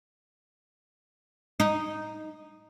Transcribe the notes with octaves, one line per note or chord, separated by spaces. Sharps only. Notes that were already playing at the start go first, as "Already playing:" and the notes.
D#4